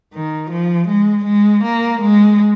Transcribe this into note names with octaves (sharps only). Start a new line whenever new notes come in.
D#3
F3
G#3
G#3
A#3
G#3